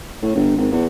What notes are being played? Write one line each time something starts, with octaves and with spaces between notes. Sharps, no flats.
A2
G1
G#1
E2